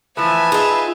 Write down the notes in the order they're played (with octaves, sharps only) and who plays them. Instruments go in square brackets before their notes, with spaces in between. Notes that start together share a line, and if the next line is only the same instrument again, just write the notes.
[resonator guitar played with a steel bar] E3 F3 A3 [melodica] B4 [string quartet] E5 G#5 A5
[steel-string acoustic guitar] D#4 F4 [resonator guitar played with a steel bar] G#4